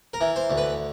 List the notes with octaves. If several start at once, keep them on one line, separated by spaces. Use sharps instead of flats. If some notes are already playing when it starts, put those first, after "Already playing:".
A#4
E3
C5
D2
B4